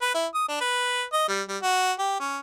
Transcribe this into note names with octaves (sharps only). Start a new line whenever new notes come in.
B4
E4
D#6
D4
B4
D#5
G3
G3
F#4
G4
C#4